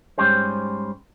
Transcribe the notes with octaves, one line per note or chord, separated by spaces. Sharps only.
G#2 G3 C#4 G4 C5